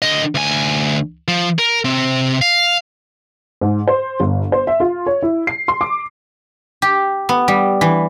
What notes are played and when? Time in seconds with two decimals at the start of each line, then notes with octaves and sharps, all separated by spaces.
0.02 D3 D#5
0.35 D2 G#5
1.28 F3
1.59 A#4
1.85 C3 C4
2.41 F5
3.61 G#2
3.87 C5
4.20 G1
4.52 C5
4.67 E5
4.80 F4
5.06 C#5
5.23 E4
5.47 C7
5.68 C6
5.81 D6
6.82 G4
7.29 B3
7.48 G3
7.81 E3